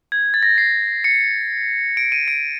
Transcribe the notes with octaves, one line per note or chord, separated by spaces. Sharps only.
G#6
A6
A#6
C7
C#7
D7
D#7
D7